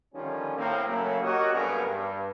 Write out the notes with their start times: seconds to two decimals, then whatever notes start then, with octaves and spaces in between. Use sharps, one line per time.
0.14 D3 D#3 F3 G3 C#4
0.57 A2 A#3 C4
0.86 C#3 F#3 A3 A#3
1.22 F#4 G4 A#4 C#5 D#5
1.52 F#1 G2 D3 B3 G#4 A#4
1.85 G2